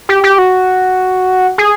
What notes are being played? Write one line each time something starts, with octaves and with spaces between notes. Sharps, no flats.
G4
G4
F#4
G#4